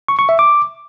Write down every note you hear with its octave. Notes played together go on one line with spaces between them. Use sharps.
C#6
C#6
E5
D6